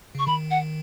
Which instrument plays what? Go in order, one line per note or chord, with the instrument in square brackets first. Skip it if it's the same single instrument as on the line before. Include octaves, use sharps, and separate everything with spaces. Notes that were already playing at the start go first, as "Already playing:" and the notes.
[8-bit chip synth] C#3 [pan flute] C#6
[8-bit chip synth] D#3 [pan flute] B5
[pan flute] F#5